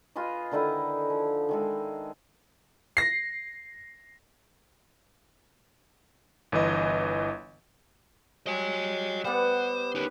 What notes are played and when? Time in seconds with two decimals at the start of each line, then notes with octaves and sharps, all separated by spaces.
0.16 F4 G#4 B4 D#5
0.51 D3 D#3 D#4 E4
1.10 F3
1.49 D#3 G#3 A4
2.97 A#6 C7
6.52 G1 E3 D#5
8.46 F#3 G3 D#5 G#5
9.25 G3 B3 C5 F#5
9.95 D#3 C#4 D#4 G4 B4